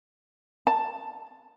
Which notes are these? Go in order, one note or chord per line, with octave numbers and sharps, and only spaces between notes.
A5